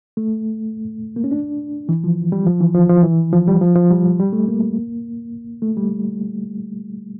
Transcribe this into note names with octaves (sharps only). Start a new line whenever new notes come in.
A3
A#3
C#4
D4
E3
F3
G3
F3
E3
F3
F3
E3
F3
G3
F3
F3
G3
G3
A3
A#3
A3
G3